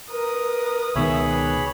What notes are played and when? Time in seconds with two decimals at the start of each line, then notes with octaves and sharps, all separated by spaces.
0.11 A#4 B4 D#6
0.95 C#2 B2 D#3 G#4 C#5 E5 B5
1.29 D4 G4 B4